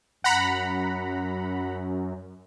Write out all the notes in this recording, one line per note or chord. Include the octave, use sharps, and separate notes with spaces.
F#2 F#5 A#5 B5